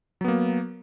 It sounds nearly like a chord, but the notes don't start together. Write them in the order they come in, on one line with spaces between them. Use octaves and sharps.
F#3 B3 A#3